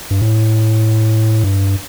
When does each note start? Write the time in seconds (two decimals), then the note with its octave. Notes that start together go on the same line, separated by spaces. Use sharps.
0.11 G2
0.22 A2
1.44 G2